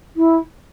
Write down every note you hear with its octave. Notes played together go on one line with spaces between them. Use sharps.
E4